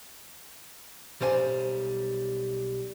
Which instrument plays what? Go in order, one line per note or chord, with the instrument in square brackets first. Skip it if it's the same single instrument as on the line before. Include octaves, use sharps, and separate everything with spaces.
[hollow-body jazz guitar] B1 G3 C5 G#5